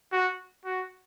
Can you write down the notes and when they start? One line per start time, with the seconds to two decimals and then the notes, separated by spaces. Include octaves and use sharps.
0.12 F#4
0.65 F#4